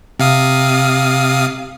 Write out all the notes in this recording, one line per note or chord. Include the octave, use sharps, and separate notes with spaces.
C3 F5 D#6